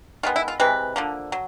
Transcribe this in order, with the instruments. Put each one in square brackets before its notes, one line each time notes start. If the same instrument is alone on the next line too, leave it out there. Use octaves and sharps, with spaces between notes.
[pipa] D#3 G#3 B3 F4
E4
F4
C3 E3 G#3 B4
D3 F3 A#3
F#3